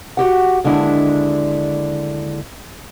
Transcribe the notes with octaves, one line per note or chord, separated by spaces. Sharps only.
F#4 G4 F#5
D#2 D3 G#3 D4 E4